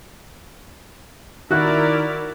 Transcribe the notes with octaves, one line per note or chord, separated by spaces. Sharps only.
D#3 E4 F#4 A#4 D5 F#6